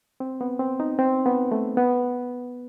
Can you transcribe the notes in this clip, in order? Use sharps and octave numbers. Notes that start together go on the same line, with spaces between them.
C4
B3
C4
D#4
C4
B3
A3
B3